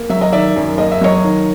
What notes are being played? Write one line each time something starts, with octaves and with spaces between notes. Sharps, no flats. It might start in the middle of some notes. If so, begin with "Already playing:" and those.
Already playing: A#3
F#3 E5
D#5
D#3 D5 E5
F#2
A#3 D#5
E5
F#3 C#5 D#5
D#3